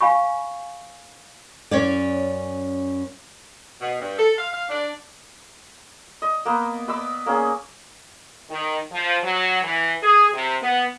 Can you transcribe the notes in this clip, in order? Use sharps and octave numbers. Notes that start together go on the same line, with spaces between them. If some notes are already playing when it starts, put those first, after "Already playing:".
F5 G#5 B5 C#6
F#2 C#4 C#5 D5
B2
G2
A4
F5
F5
D4
D#5
A#3 B3
B4 D#5 D6 E6
A#3 C#4 G#4
D#3
F3
F#3
E3
G#4
C3
B3